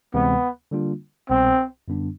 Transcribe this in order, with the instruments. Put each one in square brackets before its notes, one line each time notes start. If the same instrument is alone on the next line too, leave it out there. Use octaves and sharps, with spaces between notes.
[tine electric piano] D2 C3 E3 G#3 C4 [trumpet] B3
[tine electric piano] D3 G3 A#3 D4 F4
[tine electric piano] C2 B2 G3 B3 [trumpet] C4
[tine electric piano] F#2 D3 G3 B3 D4